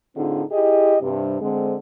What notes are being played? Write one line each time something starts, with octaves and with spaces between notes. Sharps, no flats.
A2 D3 C4 D#4 F4 G#4
E4 G4 G#4 D#5
G2 C3
D3 G#3 C4